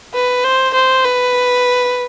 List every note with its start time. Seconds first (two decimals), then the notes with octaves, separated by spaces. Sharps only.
0.14 B4
0.44 C5
0.74 C5
1.04 B4